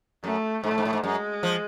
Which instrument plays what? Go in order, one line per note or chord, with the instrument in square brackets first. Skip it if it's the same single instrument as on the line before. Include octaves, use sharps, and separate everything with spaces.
[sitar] F#2 [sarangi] A3
[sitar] G#2 [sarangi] A3
[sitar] A2
G#2
A2
G#2
[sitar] F#2 [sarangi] G#3
[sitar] F3